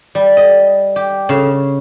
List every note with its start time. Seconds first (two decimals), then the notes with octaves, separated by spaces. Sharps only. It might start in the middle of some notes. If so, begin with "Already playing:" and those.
0.15 G3
0.37 D#5
0.96 G4
1.29 C#3